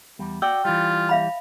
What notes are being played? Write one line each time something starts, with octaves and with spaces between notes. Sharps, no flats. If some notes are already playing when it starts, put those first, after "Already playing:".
E2 G3
F#4 D5 G5 E6
E3 G3 F4
E5 F5 B5